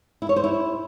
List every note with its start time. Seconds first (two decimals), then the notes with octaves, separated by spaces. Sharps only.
0.22 E4
0.29 C#5
0.36 C5
0.44 E4